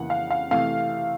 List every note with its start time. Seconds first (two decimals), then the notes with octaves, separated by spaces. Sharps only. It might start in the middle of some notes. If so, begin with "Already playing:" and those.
Already playing: F2 C#3 E3 A#3 F#5
0.10 F5
0.30 F5
0.51 C3 E3 A3 F5